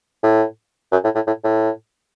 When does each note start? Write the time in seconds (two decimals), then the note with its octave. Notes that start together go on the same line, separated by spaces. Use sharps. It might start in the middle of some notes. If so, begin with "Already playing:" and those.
0.23 A2
0.92 F#2
1.04 A2
1.15 A2
1.27 A2
1.44 A2